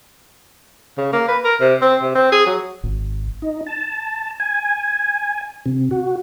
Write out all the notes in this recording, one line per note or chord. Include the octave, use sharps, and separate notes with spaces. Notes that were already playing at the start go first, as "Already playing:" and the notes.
C#3
A#3
B4
A#4
C3
C4
C3
C4
G#4
F#3
G#1
D#4
A5
G#5
C3
F#4